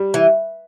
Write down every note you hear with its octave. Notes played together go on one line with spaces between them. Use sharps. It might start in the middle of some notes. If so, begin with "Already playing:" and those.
Already playing: G3
E3